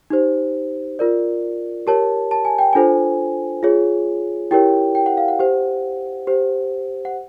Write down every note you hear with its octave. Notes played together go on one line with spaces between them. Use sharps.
D#4 G4 C5
F4 A#4 D5
G4 A#4 C#5 A5
A5
G#5
G5
D4 F4 A4 C5 G#5
F4 G#4 C#5
E4 G4 A#4 C#5 G5
G5
F#5
F5
F#5
G4 C5
G4 C5
F#5